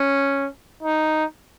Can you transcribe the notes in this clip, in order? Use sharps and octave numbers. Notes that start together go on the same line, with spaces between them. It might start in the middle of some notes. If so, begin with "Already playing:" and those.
Already playing: C#4
D#4